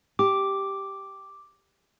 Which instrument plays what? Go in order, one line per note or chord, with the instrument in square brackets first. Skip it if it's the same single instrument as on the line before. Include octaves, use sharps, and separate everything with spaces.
[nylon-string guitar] G4 [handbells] D6